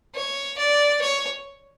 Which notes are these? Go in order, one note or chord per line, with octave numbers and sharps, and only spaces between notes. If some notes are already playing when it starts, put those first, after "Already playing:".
C#5
D5
C#5